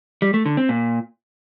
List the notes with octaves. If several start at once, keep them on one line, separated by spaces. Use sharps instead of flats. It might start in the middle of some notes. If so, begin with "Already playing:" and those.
G3
A3
D3
C4
A#2